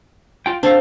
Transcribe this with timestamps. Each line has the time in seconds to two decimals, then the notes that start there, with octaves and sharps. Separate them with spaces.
0.46 F4 G5
0.63 C4 D4 A4 F5